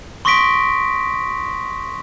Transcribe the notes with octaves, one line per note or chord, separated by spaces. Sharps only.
C6 C#6 D#6 A#6 B6 D7